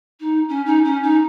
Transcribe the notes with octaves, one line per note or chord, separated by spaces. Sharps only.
D#4
C#4
D#4
C#4
D#4